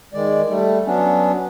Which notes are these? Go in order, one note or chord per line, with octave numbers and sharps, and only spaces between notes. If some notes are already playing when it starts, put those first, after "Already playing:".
D#3 G#3 D5
G3 A3
F#3 B3 C#4 D4